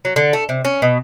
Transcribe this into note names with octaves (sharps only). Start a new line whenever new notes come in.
F#3
D3
A3
C3
C#4
B2